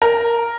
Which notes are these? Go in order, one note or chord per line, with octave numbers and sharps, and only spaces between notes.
A#4